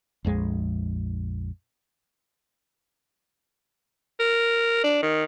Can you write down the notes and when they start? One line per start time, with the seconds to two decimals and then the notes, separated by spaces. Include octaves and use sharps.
0.25 A#1 F2 G#3
4.20 A#4
4.84 D4
5.02 D#3